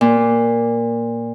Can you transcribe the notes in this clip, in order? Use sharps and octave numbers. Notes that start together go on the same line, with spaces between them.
A#2